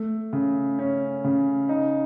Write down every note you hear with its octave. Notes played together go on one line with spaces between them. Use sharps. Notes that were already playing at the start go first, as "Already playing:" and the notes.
Already playing: A3
C#3
C#4
C#3
D#4